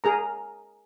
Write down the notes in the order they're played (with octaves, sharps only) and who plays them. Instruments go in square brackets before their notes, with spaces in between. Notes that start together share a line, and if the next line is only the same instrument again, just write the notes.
[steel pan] G#4 A#4 A#5